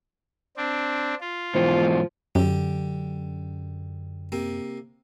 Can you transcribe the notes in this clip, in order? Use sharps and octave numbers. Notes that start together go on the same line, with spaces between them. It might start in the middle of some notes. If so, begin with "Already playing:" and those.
C4 D4
F4
G#2 B2 E3 F3
F#2 D3 G4
C3 A#3